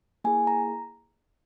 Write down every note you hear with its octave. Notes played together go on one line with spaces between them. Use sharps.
A#3 E4 G#4 G#5
A#5